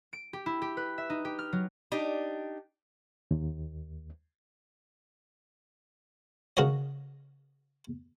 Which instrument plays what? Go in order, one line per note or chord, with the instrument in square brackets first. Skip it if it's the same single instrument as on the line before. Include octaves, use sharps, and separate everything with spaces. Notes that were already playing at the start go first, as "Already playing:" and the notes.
[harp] D7
G4
E4
G4
B4
E5
D#4
G4
F6
F#3
[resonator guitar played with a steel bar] D4 D#4 G4
[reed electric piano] D#2
[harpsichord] C#3 F#4 A#4 C#5 D#5